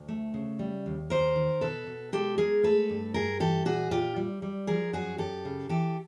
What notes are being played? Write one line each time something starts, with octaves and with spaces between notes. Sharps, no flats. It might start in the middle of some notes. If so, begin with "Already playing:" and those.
Already playing: D2
A3
C#3
G3
D#2
D#2 A#4 C5
D#3
B2 A4 B4
B2
G#3 G4 A4
G#3 G#4 A#4
A3 A4 B4
G2
G2 G#4 A#4
E3 G4 A4
A#2 F#4 G#4
A#2 F4 G4
G3
G3
F3 G#4 A#4
F#2 F#4 G#4
F#2 G4 A4
C#3
E3 G4 A4